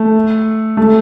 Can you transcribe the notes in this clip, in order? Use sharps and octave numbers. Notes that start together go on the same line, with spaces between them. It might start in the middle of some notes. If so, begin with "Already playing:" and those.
Already playing: A3
A3